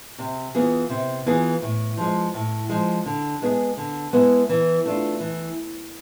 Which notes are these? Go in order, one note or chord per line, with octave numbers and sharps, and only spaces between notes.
C3
E3 B3 F4 G#4
C3
E3 B3 F4 G#4
A2
F3 G#3
A2
F3 G#3
D3
G#3 B3 E4 G#4
D3
G#3 B3 E4 G#4
E3
A3 D4 F4
E3